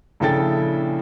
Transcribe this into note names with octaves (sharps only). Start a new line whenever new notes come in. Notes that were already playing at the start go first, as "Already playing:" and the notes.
A#1 C#3 E4 A4 G5 A6